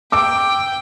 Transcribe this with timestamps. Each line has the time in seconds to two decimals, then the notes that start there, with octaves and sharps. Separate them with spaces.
0.12 G5 D6 E6 D7